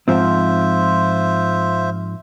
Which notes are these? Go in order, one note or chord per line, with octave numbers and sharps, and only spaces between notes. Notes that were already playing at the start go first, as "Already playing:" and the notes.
G#2 F3 C4 F4 C5 E5